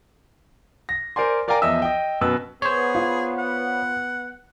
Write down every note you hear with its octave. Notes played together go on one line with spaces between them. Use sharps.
A#6
A#4 C5 D5 G#5 C6
A#4 D5 F5 G5 G#5 A#5
E2 F3 D#5 E5 E6
D#5 G5
F#2 B2 B4 E6
B3 G#4 C5 C#5
F4
F#5